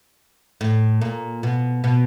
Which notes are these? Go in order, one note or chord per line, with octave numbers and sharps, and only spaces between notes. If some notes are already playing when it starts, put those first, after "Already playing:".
A2
A#2
B2
B2